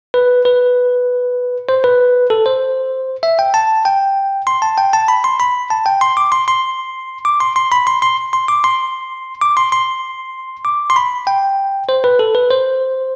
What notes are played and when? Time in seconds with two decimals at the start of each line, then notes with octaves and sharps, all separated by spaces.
0.14 B4
0.45 B4
1.69 C5
1.84 B4
2.30 A4
2.46 C5
3.23 E5
3.39 G5
3.54 A5
3.85 G5
4.47 C6
4.62 A5
4.78 G5
4.93 A5
5.08 B5
5.24 C6
5.40 B5
5.70 A5
5.86 G5
6.01 C6
6.17 D6
6.32 C6
6.48 C6
7.25 D6
7.40 C6
7.56 C6
7.72 B5
7.87 C6
8.02 C6
8.33 C6
8.48 D6
8.64 C6
9.41 D6
9.57 C6
9.72 C6
10.65 D6
10.90 C6
10.96 B5
11.27 G5
11.89 C5
12.04 B4
12.19 A4
12.35 B4
12.50 C5